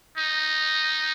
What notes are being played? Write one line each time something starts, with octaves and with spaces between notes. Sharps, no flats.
D#4